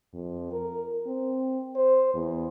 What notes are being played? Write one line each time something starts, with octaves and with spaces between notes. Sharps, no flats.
F2
A#4
C4
C5
E2